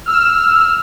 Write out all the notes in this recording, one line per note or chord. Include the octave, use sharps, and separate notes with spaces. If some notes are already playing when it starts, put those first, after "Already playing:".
E6 F6